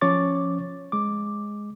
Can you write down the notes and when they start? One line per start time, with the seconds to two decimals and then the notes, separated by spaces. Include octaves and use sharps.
0.01 F3 C#4 C#5 C#6 D6 A6
0.92 G#3 D6